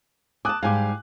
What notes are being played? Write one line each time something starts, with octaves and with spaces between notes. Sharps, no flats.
G#5 A5 D6 D#6 F#6
G#2 G3 F5 G#5 D6